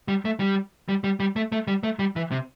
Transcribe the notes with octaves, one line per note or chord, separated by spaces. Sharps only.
G3
A3
G3
G3
G3
G3
A3
A3
G3
A3
G3
E3
C3